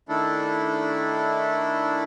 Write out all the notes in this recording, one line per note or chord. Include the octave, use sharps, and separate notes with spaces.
D#3 A3 D4 E4 A4